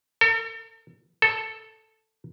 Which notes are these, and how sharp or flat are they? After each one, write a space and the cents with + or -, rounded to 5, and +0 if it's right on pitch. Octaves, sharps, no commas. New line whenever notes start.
A4 +40
A4 +0